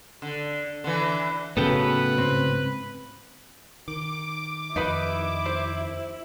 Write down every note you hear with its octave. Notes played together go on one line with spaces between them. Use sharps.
D3
D3 E3
A2 C#3 F#3 B3 A4 B4 G5
C#2 G#2 C4
D#3 D6
F2 D#3 D#4 E4 B4 B5
C5